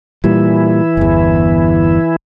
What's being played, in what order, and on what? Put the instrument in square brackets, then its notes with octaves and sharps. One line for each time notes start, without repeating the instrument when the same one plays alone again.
[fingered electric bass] A#2 G3 [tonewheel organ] E3 E4
[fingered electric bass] G1 E2